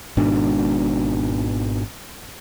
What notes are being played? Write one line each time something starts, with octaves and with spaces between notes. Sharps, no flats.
G#1 G#2 B2 D4